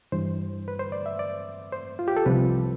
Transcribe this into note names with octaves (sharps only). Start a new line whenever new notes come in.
G2 E3 C5
B4
C5
D5
E5
D5
C5
F4
G4
A4
C2 C3 F3 B4